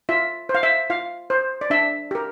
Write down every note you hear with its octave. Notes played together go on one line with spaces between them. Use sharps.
F4 E5
C5
F5
E5
F4 F5
C5
D5
D4 E5
G4 A#4